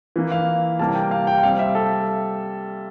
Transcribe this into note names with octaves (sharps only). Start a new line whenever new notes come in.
E3 A#3
F5
C3 G3 A#3 A5
G5
F5
G5
G5
C3 G3 C4 F5
E5
A4